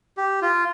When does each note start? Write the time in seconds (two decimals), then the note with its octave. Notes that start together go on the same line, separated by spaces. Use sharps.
0.17 G4
0.42 F4